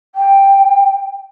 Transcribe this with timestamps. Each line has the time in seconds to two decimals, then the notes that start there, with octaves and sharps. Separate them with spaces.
0.15 G5